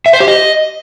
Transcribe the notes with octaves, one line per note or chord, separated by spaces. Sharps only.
E5
C5
G4
D#5